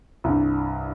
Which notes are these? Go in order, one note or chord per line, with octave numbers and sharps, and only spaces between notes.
C2 G2